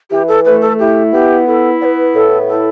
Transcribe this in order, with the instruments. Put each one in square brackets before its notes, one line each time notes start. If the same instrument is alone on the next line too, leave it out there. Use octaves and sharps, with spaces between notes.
[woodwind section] E3 [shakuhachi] G4
[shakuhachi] A4
[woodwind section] A3 [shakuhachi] B4
[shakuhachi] A4
[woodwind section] E4 [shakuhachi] G4
[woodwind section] B3 [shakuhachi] G4
[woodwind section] E4 [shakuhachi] A4
[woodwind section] B3 [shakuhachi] D5
[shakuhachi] B4
[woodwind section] A2 [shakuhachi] A4
[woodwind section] E4 [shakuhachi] A4